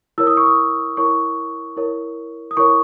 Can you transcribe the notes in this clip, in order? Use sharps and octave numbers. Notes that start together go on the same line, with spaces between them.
E4 A#4 C#5 E6
D#6
C#6
D#6
E4 A#4 C#5 C#6
E4 A#4 C#5
D#6
E4 A#4 C#5 C#6